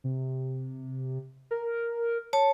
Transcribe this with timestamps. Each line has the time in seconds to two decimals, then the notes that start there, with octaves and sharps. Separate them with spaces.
0.04 C3
1.51 A#4
2.33 C#5 A5